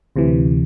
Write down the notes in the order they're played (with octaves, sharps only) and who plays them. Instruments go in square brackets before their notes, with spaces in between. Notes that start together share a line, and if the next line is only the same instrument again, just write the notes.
[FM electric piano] D2 C3 E3